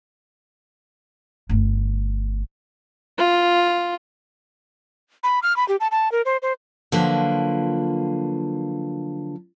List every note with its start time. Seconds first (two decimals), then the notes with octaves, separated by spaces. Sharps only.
1.49 G1 A3
3.18 F4
5.24 B5
5.43 F6
5.57 B5
5.68 G4
5.80 A5
5.91 A5
6.12 A#4
6.25 C5
6.42 C5
6.92 D3 F3 F#3 A#3 F4 B4